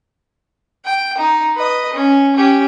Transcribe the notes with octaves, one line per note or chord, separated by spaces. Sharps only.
G5
D#4
B4 D#5
C#4
C#4 G4